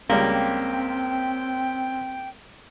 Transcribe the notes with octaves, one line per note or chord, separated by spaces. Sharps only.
C#2 G3 A#3 C4 G5